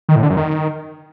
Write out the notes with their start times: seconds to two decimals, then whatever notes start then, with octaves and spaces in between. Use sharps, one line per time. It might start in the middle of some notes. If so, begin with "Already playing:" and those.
0.09 D#3
0.16 A2
0.23 D3
0.30 F#2
0.37 D#3